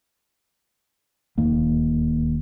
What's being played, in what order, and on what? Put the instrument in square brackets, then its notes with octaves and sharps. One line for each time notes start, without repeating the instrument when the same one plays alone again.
[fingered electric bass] D1 D#2 D#3 A#3